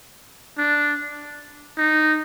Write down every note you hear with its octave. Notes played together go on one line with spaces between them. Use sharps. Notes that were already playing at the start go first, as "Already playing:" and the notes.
D4
D#4